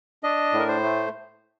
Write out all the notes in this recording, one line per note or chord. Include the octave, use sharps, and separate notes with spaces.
D4 D#5
A2
A#4
C5
A3